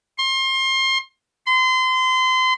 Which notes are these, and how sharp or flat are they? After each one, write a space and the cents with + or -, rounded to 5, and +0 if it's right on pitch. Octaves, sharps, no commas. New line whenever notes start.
C6 +30
C6 -30